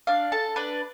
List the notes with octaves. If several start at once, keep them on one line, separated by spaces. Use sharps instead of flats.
D4 F5
A4 A5
D4 B4